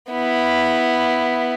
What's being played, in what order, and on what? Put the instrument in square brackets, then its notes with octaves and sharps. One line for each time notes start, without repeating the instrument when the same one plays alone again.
[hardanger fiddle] B3 E4